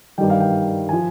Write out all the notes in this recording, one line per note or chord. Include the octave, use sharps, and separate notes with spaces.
G2 D#3 G3 G5
F5
G5
F3 G#5